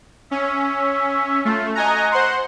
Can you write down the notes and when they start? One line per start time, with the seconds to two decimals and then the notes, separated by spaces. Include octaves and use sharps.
0.31 C#4 E5
1.45 A3 F4
1.75 F#4 D#5 G#5 A#5
2.12 C5 F#5 C6